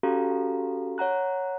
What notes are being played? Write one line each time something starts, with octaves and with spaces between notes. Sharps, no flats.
C#4 F#4 G4 A4 F5 A#5
C#5 F#5 A#5 F#6